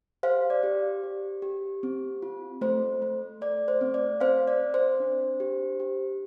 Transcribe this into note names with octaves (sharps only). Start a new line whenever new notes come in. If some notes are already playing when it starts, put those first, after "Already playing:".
G4 C5 F5
D5
G4
G4
G4
C4
F4
A3 C5
A3
A3 D5
C5
C4
D5
C4 C5 F5
D5
C4
C5
D4
G4
G4